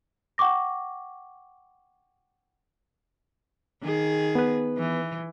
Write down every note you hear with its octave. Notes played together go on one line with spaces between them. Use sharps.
F#5 G5 C#6 D6 A#6
D#3 G#4
B3 B4
E3